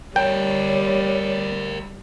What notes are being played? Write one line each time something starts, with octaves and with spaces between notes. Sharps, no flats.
G3 G4 A#4 C#5 G5